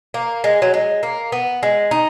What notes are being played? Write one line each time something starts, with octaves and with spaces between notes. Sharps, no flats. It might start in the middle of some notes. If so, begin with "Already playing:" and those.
A#3
G#3
F#3
G#3
A#3
B3
G#3
D#4